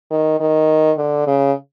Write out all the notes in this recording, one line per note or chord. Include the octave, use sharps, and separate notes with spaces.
D#3
D#3
D3
C#3